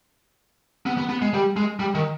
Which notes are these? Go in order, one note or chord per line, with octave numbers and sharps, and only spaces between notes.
B3
B3
B3
G#3
G3
G#3
G3
D#3